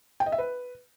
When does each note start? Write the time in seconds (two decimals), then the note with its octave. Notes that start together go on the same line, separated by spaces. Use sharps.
0.20 G5
0.26 D#5
0.32 E5
0.38 B4